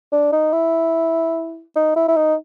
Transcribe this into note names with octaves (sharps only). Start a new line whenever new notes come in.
D4
D#4
E4
D#4
E4
E4
D#4